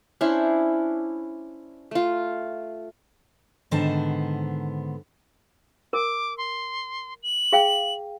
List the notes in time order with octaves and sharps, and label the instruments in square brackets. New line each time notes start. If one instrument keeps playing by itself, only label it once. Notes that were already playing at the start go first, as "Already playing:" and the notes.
[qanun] C#4 D4 E4 C5
A3 F4
[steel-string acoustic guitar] G#2 D3 D#3 B3 C5 A5
[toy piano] A#4 [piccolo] D6
[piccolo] C6
F#7
[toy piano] G#4 F5 G5